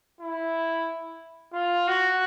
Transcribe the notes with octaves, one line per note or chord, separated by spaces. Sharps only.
E4
F4
F#4